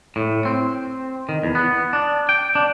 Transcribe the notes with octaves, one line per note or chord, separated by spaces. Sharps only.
A2
C4
D#3
E2
B3
D4
G5
D4